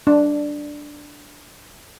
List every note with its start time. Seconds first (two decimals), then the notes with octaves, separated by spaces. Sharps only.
0.07 D4